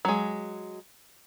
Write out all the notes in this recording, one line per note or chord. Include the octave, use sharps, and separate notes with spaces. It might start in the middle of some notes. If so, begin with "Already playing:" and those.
F#3 G#3